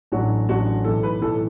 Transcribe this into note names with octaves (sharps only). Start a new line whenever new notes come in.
A1 A2 F#3 D4 F#4
A1 A2 F#3 D4 F#4
B1 A2 E3 A4
B4
B1 A2 E3 A4